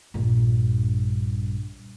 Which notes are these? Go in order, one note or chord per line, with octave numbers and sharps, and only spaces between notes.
A#1 G2